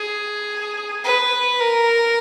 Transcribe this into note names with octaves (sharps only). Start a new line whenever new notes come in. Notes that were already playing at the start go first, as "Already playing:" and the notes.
Already playing: G#4
B4
A#4